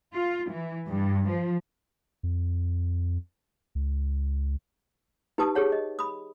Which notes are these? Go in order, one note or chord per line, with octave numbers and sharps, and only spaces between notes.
F4
E3
G2
F3
F2
C#2
D#4 G4 B4 A5 D#6
G4 G#4 C#5 F#5
D#5
B5 D#6